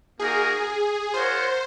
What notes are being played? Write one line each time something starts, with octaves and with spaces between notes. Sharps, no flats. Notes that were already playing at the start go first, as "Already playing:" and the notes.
A#3 D#4 F#4 G#4 A#4
F4 A#4 C5 C#5 F#5